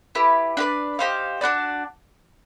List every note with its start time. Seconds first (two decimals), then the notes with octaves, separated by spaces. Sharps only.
0.15 E4 G4 B4
0.57 D4 G4 B4 D5
0.99 D#4 G4 C5 F5
1.41 D4 F#4 B4 D5